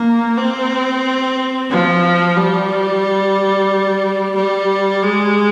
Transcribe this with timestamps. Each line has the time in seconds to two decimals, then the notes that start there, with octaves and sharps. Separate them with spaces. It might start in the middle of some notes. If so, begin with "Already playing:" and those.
Already playing: A#3
0.38 C4
1.70 F3
2.36 G3
4.35 G3
5.02 G#3